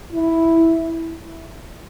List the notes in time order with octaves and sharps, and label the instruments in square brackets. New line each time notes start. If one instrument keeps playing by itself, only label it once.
[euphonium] E4